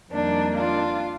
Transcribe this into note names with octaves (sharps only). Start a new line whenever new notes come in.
F2 D#3 G3 A#3 D4
D4 F4